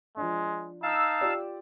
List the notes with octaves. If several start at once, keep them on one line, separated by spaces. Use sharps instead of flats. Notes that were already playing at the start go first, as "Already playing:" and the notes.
F3 G#3 D4
D#4 F5 A5 E6
F4 G4 D5